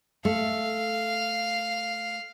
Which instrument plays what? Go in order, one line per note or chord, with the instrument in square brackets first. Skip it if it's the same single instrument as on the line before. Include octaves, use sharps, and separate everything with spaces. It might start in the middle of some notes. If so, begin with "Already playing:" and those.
[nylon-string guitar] A3 [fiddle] F5